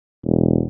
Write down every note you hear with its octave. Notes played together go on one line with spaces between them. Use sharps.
E1